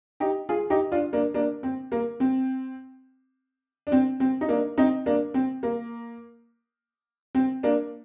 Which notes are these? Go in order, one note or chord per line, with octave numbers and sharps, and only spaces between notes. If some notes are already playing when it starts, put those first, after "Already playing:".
D#4 G4
F4 G#4
D#4 G4
D4 F4
A#3 D4
A#3 D4
C4
A#3
C4
D4
C4
C4
D#4
A#3 D4
C4 D#4
A#3 D4
C4
A#3
C4
A#3 D4